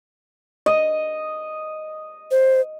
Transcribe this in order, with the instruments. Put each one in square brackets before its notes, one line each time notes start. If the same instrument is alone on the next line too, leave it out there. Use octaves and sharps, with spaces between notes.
[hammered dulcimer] D#5
[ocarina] C5